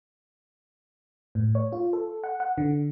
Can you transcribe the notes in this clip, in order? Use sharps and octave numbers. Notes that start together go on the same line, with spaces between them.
A2
C#5
F4
A4
F#5
F#5
D3